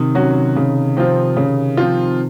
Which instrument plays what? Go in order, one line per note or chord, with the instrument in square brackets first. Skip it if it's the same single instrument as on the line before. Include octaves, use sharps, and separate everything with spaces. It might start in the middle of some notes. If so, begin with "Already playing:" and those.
Already playing: [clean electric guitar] C3 D#3
[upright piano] F#3 C#4 F#4
C#3
F3 C4 F4
C#3
F3 C4 F4